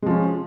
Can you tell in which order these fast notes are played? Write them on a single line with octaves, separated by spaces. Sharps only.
G#3 F3 C#4